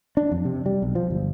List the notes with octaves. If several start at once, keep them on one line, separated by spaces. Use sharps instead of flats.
D4
F2
C3
G3
B1
F3
G1